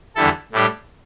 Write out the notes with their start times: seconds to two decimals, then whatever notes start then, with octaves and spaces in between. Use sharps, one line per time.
0.15 E2 D3 G3 E4 A4
0.53 A2 G3 D4 G4